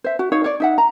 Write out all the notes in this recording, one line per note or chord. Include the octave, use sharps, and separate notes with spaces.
C5 E5
F#4
D#4 C#5 F5
C#5 D5
D#4 E5 F#5
A#5